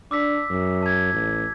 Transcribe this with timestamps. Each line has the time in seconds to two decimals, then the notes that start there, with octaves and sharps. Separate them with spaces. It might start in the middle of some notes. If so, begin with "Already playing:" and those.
0.11 D4 D6 E6 B6
0.50 F#2
0.82 A5 G#6
1.13 A1